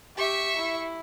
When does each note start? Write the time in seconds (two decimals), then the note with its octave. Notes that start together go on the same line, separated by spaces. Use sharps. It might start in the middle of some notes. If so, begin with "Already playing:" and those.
0.17 G4 E5 C#6
0.56 E4